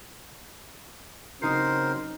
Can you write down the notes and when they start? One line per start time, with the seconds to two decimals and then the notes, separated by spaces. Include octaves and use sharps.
1.42 C#3 F#3 C4 D#4 A#4 C5 C7